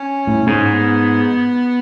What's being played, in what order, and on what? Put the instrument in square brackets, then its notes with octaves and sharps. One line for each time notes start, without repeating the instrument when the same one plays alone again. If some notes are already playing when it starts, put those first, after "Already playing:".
Already playing: [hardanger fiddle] C#4
[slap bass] A2
G#2
[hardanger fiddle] B3